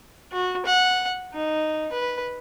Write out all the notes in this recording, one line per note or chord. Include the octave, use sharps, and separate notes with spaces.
F#4
F#5
D#4
B4